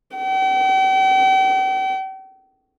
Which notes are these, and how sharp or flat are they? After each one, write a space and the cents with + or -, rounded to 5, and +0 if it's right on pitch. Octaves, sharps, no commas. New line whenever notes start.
G5 -40